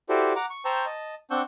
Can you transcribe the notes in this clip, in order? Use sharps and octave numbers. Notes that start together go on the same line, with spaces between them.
E4 F#4 G4 A4 C5 D5
F#5 A#5 D6
C#6
C5 G5 A5 A#5 C#6 E6
D#5 A5
C4 D4 F#5 C#6 E6 G6